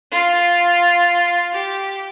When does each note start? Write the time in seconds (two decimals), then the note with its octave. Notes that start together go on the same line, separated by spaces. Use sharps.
0.11 F4
1.53 G4